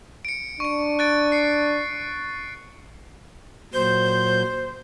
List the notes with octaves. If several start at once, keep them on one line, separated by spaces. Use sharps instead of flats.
C#7 D7
D4 C#6 D7
F#6 A6 D7
C7 C#7
A#2 F#3 C5 G6